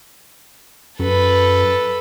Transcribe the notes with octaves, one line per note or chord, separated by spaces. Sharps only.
F#2 A4 B4